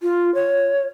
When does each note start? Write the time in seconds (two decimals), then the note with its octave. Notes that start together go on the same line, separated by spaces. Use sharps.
0.02 F4
0.35 C#5